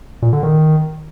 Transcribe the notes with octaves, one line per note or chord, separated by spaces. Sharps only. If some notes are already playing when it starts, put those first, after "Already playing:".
A#2
D3
D#3